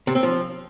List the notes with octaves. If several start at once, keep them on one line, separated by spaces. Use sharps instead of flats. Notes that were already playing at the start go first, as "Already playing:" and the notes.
C3
C4
F3